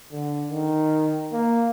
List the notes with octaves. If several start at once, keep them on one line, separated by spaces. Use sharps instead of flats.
D3
D#3
A#3